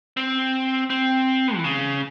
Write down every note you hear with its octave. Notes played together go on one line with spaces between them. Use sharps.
C4
C4
E3
C#3